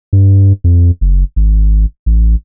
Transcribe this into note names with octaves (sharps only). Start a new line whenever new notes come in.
G2
F2
F#1
G#1
A1